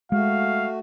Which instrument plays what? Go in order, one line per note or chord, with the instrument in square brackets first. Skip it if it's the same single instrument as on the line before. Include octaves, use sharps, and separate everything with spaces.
[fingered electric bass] G#3 [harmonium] A3 F#4 [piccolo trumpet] F5